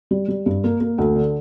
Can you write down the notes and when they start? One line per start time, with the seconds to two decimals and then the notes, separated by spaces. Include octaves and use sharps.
0.11 G3
0.28 G3
0.46 G2
0.64 A#3
0.81 A#3
0.98 D2
1.16 D3